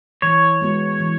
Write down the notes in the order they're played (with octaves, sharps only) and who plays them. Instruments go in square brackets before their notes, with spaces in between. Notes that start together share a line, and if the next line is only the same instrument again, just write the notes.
[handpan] E3 [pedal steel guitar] C#5
[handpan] G#3 B3 F#4
E3